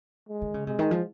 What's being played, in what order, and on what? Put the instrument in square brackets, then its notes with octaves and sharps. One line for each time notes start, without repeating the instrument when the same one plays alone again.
[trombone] G#3
[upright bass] D#3
C#3
[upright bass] C3 [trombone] G#3
[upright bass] D#3
F3